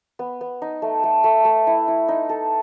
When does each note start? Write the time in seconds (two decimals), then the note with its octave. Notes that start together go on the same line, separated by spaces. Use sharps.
0.19 B3
0.41 B3
0.62 D#4
0.82 A3
1.04 A3
1.24 A3
1.45 A3
1.67 E4
1.88 E4
2.08 D#4
2.29 A4